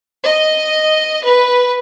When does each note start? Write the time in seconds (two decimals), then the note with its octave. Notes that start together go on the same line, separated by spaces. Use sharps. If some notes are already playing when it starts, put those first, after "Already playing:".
0.25 D#5
1.23 B4